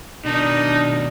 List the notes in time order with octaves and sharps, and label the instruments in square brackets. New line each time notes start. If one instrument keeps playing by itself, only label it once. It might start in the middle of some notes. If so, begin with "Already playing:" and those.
[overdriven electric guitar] B2 D#3 [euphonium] D4 [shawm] D#4